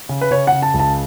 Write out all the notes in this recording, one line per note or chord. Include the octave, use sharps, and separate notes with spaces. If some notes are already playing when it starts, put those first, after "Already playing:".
C#3
B4
C#3 C#5
C#3 F#5
A5
C#2
A5